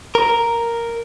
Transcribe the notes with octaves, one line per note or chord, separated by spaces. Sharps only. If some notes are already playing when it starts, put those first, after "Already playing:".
A#4